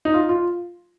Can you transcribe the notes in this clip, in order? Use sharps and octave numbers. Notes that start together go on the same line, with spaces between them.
D#4
F4
F4